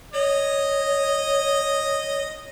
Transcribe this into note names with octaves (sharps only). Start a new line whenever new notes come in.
C#5 D#5